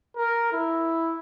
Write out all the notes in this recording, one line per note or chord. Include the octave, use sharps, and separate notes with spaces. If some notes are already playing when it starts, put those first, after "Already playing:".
A#4
E4